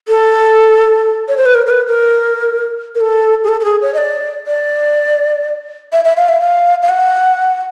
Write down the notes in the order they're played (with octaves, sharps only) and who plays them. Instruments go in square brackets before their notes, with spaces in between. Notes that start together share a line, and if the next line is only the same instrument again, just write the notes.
[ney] A4
C#5
C5
B4
A#4
A#4
B4
A#4
A#4
A4
G#4
A4
A4
G#4
C#5
D#5
D5
D5
E5
E5
F5
E5
F5
F5
F#5